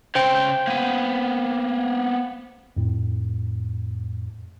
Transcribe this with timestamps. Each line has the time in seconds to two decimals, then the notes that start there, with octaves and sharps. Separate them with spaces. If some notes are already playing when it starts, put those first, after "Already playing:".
0.15 C#3 C5 G5 C6
0.67 A#3 B3
2.77 F2 A2